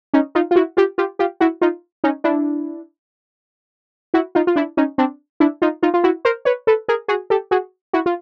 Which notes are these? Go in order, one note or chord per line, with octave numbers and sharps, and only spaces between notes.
C#4 D#4
D#4 F4
F4
E4 F#4
F4 G4
F4 G4
F4 G4
E4 F#4
D#4 F4
C#4 D#4
D4 E4
E4 F#4
D#4 F4
F4
D4 E4
C#4 D#4
C4 D4
D4 E4
D#4 F4
D#4 F4
F4
E4 F#4
A#4 C5
B4 C#5
A4 B4
G#4 A#4
F#4 G#4
G4 A4
F#4 G#4
E4 F#4
F4